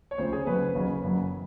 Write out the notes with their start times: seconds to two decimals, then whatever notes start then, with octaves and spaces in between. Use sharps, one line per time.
0.11 C#5
0.18 D2 C#3 F3 C5
0.33 G#4
0.47 F#1 F#2 C#3 F#3 B4
0.75 F#1 F#2 C#3 F#3
1.03 F#1 F#2 C#3 F#3